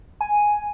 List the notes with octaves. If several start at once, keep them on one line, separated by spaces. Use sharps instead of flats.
G#5